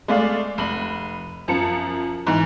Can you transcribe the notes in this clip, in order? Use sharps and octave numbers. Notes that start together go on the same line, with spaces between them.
G#3 A3 D5 F5
F1 B5 F#7
F#2 F3 A5 C#7
G#2 E3